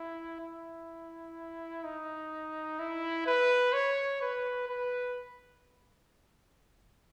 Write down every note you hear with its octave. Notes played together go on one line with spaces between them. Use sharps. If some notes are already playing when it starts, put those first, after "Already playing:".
Already playing: E4
E4
D#4
E4
B4
C#5
B4
B4